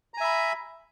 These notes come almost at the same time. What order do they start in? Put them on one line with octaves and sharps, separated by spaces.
A#5 G#5 E5 B5